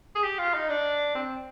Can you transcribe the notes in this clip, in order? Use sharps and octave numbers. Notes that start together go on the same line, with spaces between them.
G#4
G4
F4
D#4
D4
C4